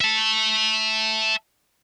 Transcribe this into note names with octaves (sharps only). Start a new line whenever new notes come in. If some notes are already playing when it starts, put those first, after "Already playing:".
E5 A5